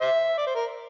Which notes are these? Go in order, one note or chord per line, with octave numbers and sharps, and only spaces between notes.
C5 E5
D5
C5
A#4